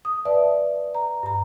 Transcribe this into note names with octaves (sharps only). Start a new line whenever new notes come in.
D#6
B4 D5 E5 A5
A#5
G2 A#5